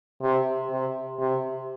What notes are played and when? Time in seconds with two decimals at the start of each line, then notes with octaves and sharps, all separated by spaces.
0.22 C3
0.71 C3
1.20 C3